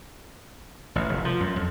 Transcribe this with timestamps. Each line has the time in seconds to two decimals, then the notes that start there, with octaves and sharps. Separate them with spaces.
0.96 A1
1.09 F1
1.25 F3
1.40 F#2
1.56 F2